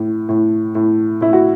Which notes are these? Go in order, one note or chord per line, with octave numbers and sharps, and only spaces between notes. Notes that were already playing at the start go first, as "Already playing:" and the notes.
Already playing: A2
A2
A2
A2 E4
F#4